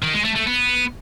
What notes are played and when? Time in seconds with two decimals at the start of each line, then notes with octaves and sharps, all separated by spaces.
0.03 D#3
0.14 G#3
0.25 A3
0.36 A3
0.47 B3